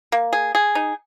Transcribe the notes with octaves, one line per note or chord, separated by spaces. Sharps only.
A#3
G#4
G#4
D#4